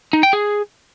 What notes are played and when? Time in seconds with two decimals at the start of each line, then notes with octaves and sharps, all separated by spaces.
0.13 D#4
0.23 G5
0.33 G#4